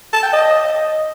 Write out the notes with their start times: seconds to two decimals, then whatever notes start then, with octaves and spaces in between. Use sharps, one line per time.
0.13 A5
0.23 G5
0.33 D#5